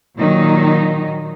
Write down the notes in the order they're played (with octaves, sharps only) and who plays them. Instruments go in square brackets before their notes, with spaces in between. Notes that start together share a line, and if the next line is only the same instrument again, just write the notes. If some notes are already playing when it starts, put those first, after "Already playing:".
[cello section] A#2 D#3 F#3 D#4